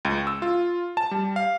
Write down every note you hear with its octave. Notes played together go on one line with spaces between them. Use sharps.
C#2
E6
F4
A5
G3
F5